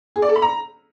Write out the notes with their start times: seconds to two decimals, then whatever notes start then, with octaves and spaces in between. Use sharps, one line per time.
0.16 G#4
0.22 D5
0.29 A4
0.36 B5
0.42 A#5